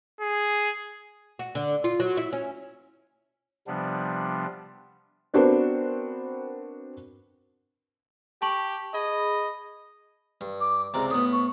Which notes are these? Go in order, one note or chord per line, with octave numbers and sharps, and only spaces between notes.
G#4
F#4
D3
F4
F#3
E4
C#4
C3 F3 G3 B3 D4
B3 C4 D4 F#4 A#4 C5
G4 A5 C#6 F#7
G#4 D#5 B5
G2
D6
C#2 C3 D5 A#5
A2 B3 D#6
C#6